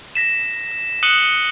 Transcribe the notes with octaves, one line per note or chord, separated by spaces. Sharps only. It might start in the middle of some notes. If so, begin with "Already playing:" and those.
A#6 B6 E7
D#6 F#6 C#7 D#7 F#7 G7